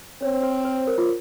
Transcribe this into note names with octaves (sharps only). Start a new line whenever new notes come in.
C4 C#5
C5
C5
A#4
F4